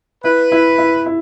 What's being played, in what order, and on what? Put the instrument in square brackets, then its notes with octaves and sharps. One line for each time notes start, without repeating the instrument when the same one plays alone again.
[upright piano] E4 [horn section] B4
[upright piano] E4
E4
E4